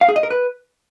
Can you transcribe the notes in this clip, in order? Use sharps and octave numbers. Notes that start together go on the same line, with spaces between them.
F5
G#4
D#5
A#4
B4